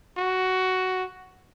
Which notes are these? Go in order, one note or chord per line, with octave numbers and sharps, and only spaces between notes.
F#4